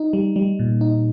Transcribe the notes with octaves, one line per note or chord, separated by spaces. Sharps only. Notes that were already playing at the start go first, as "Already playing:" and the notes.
Already playing: D#4
G3
G3
A#2
D#4